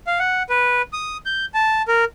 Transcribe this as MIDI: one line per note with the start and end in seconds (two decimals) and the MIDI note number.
0.07 0.19 77
0.19 0.43 78
0.50 0.82 71
0.93 1.17 87
1.26 1.46 91
1.54 1.82 81
1.88 2.05 70